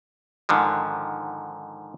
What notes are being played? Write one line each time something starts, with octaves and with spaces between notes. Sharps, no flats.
G#2 D3 D#3 F3